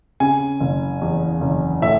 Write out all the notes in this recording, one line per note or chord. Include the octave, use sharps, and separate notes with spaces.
C#3 G#5
F#1
E2
F#1
A2 E5